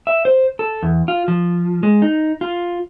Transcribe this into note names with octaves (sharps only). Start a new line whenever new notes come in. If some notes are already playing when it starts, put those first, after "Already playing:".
E5
C5
A4
E2
F4
F3
G#3
D#4
F4